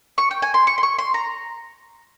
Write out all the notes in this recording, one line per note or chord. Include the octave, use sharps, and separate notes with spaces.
C#6
G5
G#5
C6
C#6
C6
C#6
C6
A#5